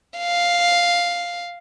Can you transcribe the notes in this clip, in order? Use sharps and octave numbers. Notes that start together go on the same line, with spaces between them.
F5